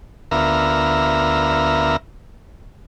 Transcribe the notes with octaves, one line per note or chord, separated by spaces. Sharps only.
D2 B3 F4 A#4 E5 A#5